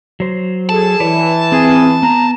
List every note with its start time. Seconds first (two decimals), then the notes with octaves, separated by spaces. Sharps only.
0.20 F#3 C5
0.69 G#4 A4 A5
1.00 E3 B4 C#5 D5
1.52 C4 G#4
2.03 B3 A#5